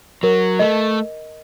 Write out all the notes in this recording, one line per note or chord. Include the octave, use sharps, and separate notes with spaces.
F#3 A#4
A3 D#5